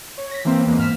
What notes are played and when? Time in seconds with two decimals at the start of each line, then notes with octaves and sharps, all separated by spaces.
0.18 C#5
0.31 A#6 B6
0.45 E3 A#3 C4
0.66 E2 E3 G#3 A#3
0.78 G#2 F6 B6 E7